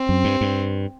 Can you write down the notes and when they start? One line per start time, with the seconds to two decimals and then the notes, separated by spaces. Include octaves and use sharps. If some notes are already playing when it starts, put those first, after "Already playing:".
Already playing: C4
0.09 F#2
0.24 G2
0.41 G2